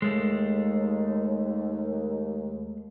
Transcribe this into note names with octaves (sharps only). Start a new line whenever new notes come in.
D#2 G#3 A3